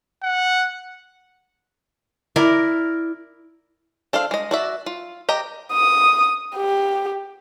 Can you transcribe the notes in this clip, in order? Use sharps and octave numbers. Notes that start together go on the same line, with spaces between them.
F#5
E4 A#4 D5
D4 A4 C5 F5
G#3 D#5
F#4 D5 E5
F4
G4 D#5 A#5
D#6
G4